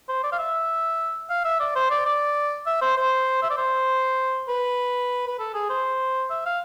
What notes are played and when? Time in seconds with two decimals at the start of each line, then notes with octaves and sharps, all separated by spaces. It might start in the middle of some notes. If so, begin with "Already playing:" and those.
0.09 C5
0.24 D5
0.32 F5
0.39 E5
1.30 F5
1.45 E5
1.60 D5
1.76 C5
1.90 D5
2.06 D5
2.66 E5
2.82 C5
2.97 C5
3.43 E5
3.50 D5
3.58 C5
4.48 B4
5.27 B4
5.40 A4
5.54 G#4
5.70 C5
6.30 E5
6.46 F5